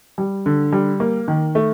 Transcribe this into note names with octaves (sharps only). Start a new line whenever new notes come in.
G3
D3
G3
A#3
D#3
A3